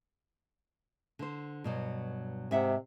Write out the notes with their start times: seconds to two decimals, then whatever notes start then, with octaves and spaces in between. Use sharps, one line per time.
1.19 D3 C5
1.64 G2 B2 F#3
2.51 G#2 C3 E5 F#5